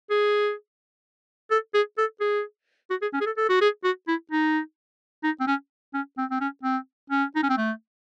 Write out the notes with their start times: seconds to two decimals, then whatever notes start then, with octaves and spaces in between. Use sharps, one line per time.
0.10 G#4
1.51 A4
1.74 G#4
1.98 A4
2.21 G#4
2.90 F#4
3.02 G#4
3.13 C#4
3.21 G#4
3.26 A4
3.37 A4
3.49 F#4
3.61 G#4
3.84 F#4
4.08 E4
4.31 D#4
5.23 D#4
5.40 C4
5.47 C#4
5.94 C#4
6.18 C4
6.31 C4
6.41 C#4
6.63 C4
7.10 C#4
7.36 D#4
7.43 C#4
7.49 C4
7.58 A3